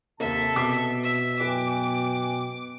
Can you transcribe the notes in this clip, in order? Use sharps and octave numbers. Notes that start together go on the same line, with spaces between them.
D#2 C3 A#3 A4 E5 A5
B2 D6 B6 C7
E5 E6
F#2 B4 G5 G#5 D6